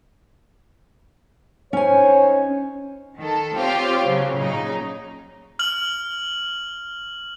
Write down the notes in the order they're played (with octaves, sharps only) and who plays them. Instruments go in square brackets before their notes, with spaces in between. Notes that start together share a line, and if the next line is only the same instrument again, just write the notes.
[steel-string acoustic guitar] C#4 G#5 [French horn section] D#4 C5 C#5
[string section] D#3 A4
C4 F4 G4 C5 C#5 F5
C#3 F#3
A#2 C#3 F#3 D#4
[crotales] F6 F#7